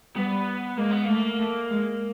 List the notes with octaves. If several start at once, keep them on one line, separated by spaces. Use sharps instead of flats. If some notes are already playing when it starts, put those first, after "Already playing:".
G3 B3
G#3 A#3
B3
A3 A#3
A3
G#3